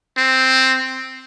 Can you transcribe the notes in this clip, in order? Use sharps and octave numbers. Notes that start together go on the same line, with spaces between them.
C4